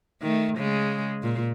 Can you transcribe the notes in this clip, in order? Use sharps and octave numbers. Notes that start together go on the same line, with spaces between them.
D#3 A3
C#3 G#3
A#2